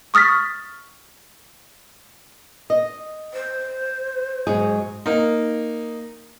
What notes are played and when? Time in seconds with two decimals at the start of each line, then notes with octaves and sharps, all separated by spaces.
0.14 C#6 D#6 F6 A6 B6
2.70 D#5
3.33 C5
4.47 G#2 F#3 G#4
5.06 A#3 D#4